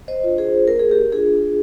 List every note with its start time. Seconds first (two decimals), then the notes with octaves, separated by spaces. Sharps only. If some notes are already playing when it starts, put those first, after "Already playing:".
0.08 C5 D#5
0.24 D4 F4
0.38 G#4 C5
0.67 A#3 A#4
0.79 G#4
0.91 G4 A#4
1.12 D4 F4 G#4